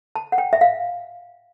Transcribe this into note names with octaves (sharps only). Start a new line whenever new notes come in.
A5
F#5
G5
E5
F5